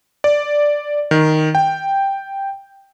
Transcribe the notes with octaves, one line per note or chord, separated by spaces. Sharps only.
D5
D#3
G5